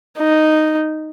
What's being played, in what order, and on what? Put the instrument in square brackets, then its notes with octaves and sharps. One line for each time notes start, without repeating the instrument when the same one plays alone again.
[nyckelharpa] D#4